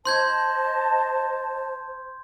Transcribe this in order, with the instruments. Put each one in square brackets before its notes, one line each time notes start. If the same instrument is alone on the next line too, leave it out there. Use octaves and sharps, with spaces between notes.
[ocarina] C5 [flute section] D#5 A5 [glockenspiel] C6 G6 G#6